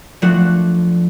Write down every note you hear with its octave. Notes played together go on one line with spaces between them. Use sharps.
F3 A3 D4 F#4